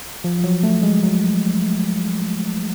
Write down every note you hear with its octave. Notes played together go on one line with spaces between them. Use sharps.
F3
F3
F#3
A3
G#3
F#3